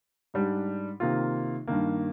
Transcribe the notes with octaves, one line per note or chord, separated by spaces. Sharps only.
G#2 G3 D4
C3 D#3 A#3 F4
G2 D#3 A#3